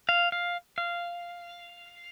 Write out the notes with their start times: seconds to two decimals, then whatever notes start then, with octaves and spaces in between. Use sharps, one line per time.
0.09 F5
0.32 F5
0.78 F5